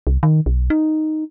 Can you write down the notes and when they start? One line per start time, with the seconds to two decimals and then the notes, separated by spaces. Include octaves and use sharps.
0.07 C2
0.23 D#3
0.46 B1
0.70 D#4